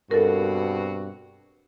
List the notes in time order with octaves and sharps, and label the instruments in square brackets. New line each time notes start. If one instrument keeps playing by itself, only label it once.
[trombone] G2 [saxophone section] B2 C4 F#4 [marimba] A4 A#4